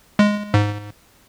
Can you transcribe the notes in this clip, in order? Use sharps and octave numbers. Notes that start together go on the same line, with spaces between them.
G#3
G#2